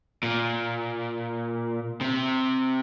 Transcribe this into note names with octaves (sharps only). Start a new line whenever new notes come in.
A#2
C3